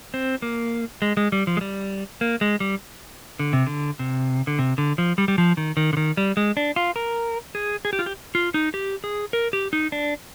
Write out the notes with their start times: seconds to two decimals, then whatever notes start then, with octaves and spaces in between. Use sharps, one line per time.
0.14 C4
0.42 A#3
1.02 G#3
1.17 G#3
1.32 G3
1.47 F3
1.57 G#3
1.61 G3
2.21 A#3
2.41 G#3
2.60 G3
3.39 D3
3.53 C3
3.67 D3
3.99 C3
4.47 D3
4.59 C3
4.78 D3
4.98 F3
5.18 G3
5.28 G3
5.38 F3
5.57 D#3
5.77 D#3
5.93 D3
5.97 D#3
6.17 G3
6.37 G#3
6.57 D4
6.76 F4
6.96 A#4
7.55 G#4
7.85 G#4
7.93 G4
7.99 F4
8.06 G4
8.35 F4
8.54 D#4
8.74 G4
9.04 G#4
9.33 A#4
9.53 G4
9.73 D#4
9.92 D4